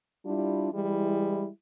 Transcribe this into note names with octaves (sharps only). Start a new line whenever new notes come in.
G3 D4 E4 F4
E3 G3 G#3 E4